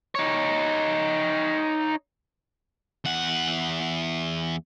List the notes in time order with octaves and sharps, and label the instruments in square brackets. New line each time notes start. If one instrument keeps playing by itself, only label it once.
[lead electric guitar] D#4 C#5
[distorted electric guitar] E2 F#5